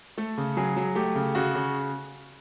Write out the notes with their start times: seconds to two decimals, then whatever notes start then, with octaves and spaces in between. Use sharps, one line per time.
0.18 A3 A4
0.38 C#3
0.57 F#3 G#4
0.76 F#3
0.95 A3 G4
1.15 C#3
1.35 C#3 F#4
1.55 C#3